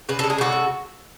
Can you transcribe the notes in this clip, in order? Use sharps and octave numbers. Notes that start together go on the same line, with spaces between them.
C#3 B4
G#3 A4
G#4
C#3 F#4 A4
C#3